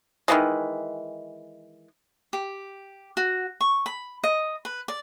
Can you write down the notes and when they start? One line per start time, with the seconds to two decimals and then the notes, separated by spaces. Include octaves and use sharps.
0.28 D#3 E3 F#3 G#3
2.33 G4
3.17 F#4
3.61 C#6
3.86 B5
4.24 D#5
4.65 B4
4.88 D5